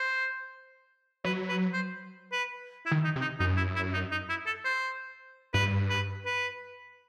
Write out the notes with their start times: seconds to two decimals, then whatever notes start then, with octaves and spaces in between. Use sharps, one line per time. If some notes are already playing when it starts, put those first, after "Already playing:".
Already playing: C5
1.24 F#3 B4
1.49 B4
1.73 C5
2.32 B4
2.86 E4
2.91 D#3
3.04 D#4
3.16 C3
3.21 D#4
3.39 F#2 D#4
3.57 E4
3.75 E4
3.94 D#4
4.11 D#4
4.29 E4
4.46 A4
4.65 C5
5.54 G2 B4
5.90 B4
6.26 B4